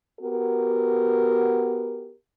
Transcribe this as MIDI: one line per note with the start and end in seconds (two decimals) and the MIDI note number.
0.20 2.13 59
0.20 2.13 66
0.20 2.13 67
0.20 2.13 70